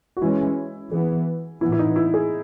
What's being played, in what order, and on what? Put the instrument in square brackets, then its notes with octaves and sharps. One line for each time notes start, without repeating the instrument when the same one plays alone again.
[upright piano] F#4
[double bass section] E3 G#3 C#4 [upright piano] E4
[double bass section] E3 B3 [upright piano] G#4
[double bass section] A2 E3 B3 [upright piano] E4
[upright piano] E4
D#4
E4
G#4